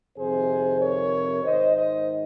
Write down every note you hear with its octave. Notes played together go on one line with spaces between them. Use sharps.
F2 C3 D#3 G#4 C5
A#4 C#5
G#2 D#3 C5 D#5
C5 D#5